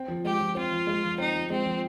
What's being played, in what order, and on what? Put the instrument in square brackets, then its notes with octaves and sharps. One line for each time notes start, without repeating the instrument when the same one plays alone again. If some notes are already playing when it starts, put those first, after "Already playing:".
Already playing: [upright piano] C4
F3
[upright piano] G#3 [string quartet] G4
[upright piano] F3
[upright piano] C4 [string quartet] F4
[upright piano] F3
G#3
F3
[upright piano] C4 [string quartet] D#4
[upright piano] F3
[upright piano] G#3 [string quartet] C4
[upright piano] F3